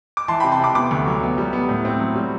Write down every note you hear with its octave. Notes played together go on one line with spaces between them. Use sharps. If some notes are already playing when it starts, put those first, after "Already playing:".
D6
E3 A5 C6
C3 G5 B5
A5 C6
C3 B5 D6
B3 B5 D6
D2
F#3
B3
G3
B3
A2
C4
F#3
G3